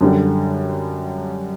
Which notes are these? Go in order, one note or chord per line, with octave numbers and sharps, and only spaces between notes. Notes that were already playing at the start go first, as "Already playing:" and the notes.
F#2 D3 G3